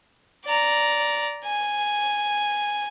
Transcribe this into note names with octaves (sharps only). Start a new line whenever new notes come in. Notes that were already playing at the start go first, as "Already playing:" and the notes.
D5 A#5
G#5